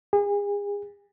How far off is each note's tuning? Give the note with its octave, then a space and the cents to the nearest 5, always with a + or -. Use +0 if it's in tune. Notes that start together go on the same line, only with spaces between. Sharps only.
G#4 -35